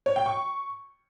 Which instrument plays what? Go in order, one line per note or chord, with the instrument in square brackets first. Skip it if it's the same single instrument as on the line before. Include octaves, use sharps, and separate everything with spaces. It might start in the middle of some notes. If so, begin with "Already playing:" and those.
[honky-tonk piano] C#5
G5
C#6